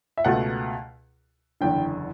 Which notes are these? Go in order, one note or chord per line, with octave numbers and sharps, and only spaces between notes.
E5
C#2 B2 A3 F#5
F#1 E2 D3 G5